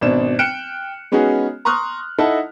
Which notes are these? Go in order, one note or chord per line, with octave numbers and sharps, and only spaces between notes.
G#1 B2 D4 E7
G5 F6 F#6 C#7 D7 E7
G#3 B3 C#4 D#4 F#4 G#4
A#5 C6 C#6 D#6 F6 F#6
D#4 E4 A4 D#5 F#5 A5